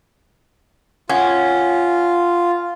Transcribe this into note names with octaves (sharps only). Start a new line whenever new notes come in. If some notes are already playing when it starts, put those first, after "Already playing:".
C#4 F4 F#5